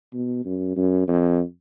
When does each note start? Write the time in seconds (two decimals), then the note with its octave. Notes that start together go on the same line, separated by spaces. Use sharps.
0.14 B2
0.45 F#2
0.76 F#2
1.08 F2